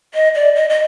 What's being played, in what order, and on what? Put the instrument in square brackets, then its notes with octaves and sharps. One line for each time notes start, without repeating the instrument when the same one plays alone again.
[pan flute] D#5
D5
D#5
D#5